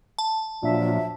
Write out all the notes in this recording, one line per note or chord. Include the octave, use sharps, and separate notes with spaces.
A5
A#2 F3 F#3 D4 F4 E5